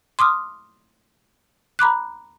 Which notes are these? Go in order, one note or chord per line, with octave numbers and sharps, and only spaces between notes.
C6 D6 D#6 F6
A#5 B5 D6 F#6